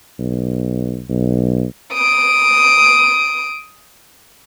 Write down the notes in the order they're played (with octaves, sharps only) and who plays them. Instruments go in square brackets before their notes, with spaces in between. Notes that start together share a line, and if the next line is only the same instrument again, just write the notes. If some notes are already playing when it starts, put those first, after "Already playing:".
[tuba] B1
B1
[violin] D#6 D7